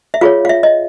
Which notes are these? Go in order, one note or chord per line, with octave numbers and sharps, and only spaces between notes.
E5
F4 G#4 C#5 F5
F5
E5
D#5